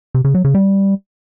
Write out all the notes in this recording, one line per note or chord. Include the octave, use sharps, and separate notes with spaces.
C3
C#3
F#3
C#3
G3